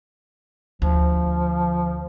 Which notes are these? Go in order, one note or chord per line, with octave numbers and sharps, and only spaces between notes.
D2 F3